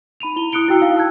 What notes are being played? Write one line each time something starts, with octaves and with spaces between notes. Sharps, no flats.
D#4 B5 D#7 F7
E4 G7
E4 D#6 F#6 C#7 D7 G7
E4 F#4 G5 E6 C7 C#7
D#4 F5
A5 E6 F#6 G#6